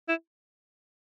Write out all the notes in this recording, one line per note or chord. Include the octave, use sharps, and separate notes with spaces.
E4